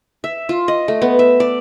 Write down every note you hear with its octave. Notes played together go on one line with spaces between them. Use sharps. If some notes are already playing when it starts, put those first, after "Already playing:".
E5
F4
D#5
A3
B3
E5
D5